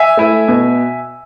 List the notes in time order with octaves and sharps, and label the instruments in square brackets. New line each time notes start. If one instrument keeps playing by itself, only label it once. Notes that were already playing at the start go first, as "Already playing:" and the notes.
Already playing: [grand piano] E5 G#5
A3 E4
B2